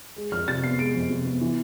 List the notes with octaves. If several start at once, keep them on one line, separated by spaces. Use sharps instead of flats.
G#3
F2 F6
C3 A6
B3 C7
G#3 D7
F2
C3
B3
E3